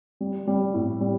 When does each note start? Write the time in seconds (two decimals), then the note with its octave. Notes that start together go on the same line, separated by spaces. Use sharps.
0.20 G3
0.47 G3
0.74 A2
1.01 G3